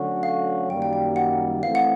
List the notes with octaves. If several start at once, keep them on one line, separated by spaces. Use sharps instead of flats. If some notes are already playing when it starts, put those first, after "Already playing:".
Already playing: D3 F#3 A3 C#4 F#4
F5
F#2 D#3 G3 A#3 G5
G5
G5
F#5
E3 A3 C4 F5
F#5